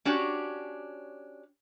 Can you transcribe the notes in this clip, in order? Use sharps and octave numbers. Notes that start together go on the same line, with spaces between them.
C#4 D4 F#4 G4 C#5